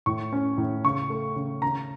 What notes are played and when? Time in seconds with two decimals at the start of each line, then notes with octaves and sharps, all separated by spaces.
0.06 A2 C#6
0.33 C#4
0.58 A2
0.85 C#3 C#6
1.10 A3
1.36 C#3
1.62 C#3 A#5